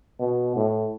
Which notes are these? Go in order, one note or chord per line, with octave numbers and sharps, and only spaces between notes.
B2
A2